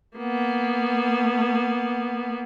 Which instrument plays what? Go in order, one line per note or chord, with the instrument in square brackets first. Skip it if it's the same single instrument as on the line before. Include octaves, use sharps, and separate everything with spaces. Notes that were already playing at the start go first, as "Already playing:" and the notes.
[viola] A#3 B3